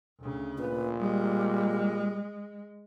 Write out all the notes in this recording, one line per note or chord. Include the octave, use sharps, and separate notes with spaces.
D2 C#3
A#2 B4
G3 G#3